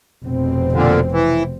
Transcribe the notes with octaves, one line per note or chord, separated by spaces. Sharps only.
F1 B2 C4
A#2 D3
E3